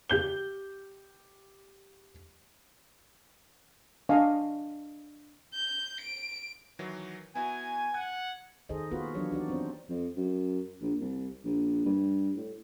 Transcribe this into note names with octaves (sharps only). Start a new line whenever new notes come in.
G4 G6 G7
D4 D#5 F5 G#5 C#6
G6
D7
D#3 E3 F#3
B3 E4 F#4 G#5
F#5 G#6
D#3 D#4 G#4 A4 C5 D#5
A#3 B3 F4 F#4 B4
E3 F#3 D4 G4 C#5
D4 D#4 F#4 D5
B3 C4 D4 F4 C5
F2
F#2
A#1
C2
A#1
G2
A2